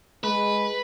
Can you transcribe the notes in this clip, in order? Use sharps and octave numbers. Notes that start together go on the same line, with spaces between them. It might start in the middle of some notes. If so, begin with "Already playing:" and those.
G#3 B4